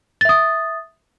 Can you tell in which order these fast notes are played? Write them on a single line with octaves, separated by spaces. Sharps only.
A6 E5 D#6